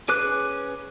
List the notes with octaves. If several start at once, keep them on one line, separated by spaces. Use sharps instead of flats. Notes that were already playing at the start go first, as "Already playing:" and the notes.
C#4 G#4 B4 D6 F#6